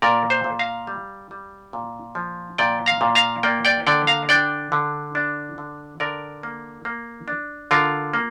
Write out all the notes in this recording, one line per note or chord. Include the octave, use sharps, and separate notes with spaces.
A#2 A#4 D5
C5 F5
A#2
F5 A#5
G3
G3
A#2
F3
A#2 D5 G5
F5 A#5
A#2
F5 A#5
A#3 D5 G5
D5 G5
D3 D5 G5
F5 A#5
D4 D5 G5
D3
D4
D3
D3 A#4 D5
A#3
A#3
D4
D3 F4 A#4
A#3